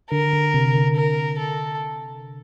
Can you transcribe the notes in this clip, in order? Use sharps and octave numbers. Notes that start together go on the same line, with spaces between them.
D3 A#4
D3
C3
D3
A#4
A4